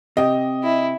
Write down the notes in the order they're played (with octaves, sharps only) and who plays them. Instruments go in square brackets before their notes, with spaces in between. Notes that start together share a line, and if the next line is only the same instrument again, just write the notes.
[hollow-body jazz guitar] C3 G4 [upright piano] D#5
[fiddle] E4